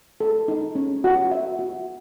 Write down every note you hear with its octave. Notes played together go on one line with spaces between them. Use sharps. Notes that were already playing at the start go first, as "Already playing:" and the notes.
A4
D#4
C#4
F#4
E5
F#4